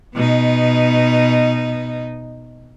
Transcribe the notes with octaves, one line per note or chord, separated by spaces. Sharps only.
B2 B3 D#4